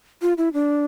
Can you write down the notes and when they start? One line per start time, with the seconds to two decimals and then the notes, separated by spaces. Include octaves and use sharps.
0.22 F4
0.38 E4
0.54 D4